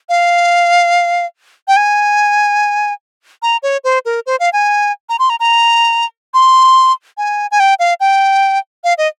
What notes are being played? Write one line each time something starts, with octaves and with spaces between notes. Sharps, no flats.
F5
G5
G#5
A#5
C#5
C5
A#4
C5
F5
G#5
A#5
C6
A#5
A#5
C6
G#5
G#5
G5
F5
G5
F5
D#5